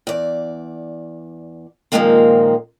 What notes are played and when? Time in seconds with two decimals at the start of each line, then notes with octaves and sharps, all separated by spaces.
0.07 E2 D5
1.92 A#2 D#3 F3 G#3 A#3 C4